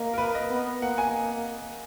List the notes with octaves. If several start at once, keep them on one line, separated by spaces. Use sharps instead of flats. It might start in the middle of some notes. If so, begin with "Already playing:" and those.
Already playing: A#3 D#5
A#4
B4
D#5
B3
A#3 F#5
G#5